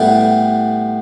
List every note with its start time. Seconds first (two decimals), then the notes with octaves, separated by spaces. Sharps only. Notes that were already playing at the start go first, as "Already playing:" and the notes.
Already playing: A2 G3 B3